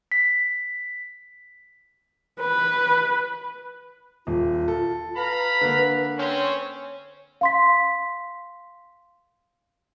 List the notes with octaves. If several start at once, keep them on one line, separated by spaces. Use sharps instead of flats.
B6
B4
D#1 F4
A4
B4 F5 A#5 B5
D3 A#3
C4 C#4 C5 C#5
F5 C6 B6